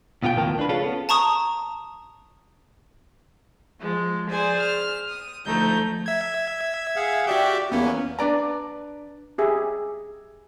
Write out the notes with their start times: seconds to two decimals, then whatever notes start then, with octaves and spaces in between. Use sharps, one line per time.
0.23 C#2 B2 F4 F#4 G5
0.36 D#2 A2 F3 B3 A#4 A5
0.57 C#2 D4 B4
0.69 C#4 F4 G#4 A4
0.84 B3
1.09 A5 A#5 C#6 D#6
3.80 F3 G#3
4.31 G#4 C5 D5 G#5
4.61 F6
5.09 D#6
5.46 D2 F3 A3 D#4 G6
6.06 E5 G#6
6.96 G#4 F5 F#5
7.27 F#4 G4 D5 E5 G5
7.72 E2 A#3 B3 C#4
8.19 D4 B4 D5 A#5
9.38 G4 G#4 E5